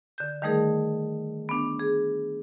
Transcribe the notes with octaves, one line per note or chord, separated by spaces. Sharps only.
D3 G6
D#3 G3 A3 D#4 G#4 A#4
B3 D4
G#4